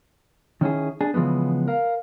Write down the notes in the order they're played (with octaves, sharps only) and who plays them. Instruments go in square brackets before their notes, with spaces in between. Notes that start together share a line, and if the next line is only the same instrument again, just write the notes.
[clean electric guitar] D#3 C#4 E4 G#4
D4 G#4
C#3 E3 F3 G#3 B3
A#4 F5